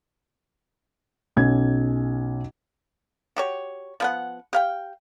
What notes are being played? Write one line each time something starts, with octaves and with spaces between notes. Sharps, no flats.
B1 C#4 G#6
F#4 G4 C#5
F3 B3 F#5
G4 F5 G5